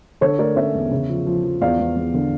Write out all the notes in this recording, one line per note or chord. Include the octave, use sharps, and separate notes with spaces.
D3 A4 C#5
A3 A#4 D5
C#4 C#5 E5
E2
C#3
F3
F3
F3
E2 D5 F5
E2
E2
D3